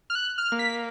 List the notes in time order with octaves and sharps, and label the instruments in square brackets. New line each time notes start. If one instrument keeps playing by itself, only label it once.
[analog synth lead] F6
F#6
F6
[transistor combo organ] A#3
[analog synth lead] B6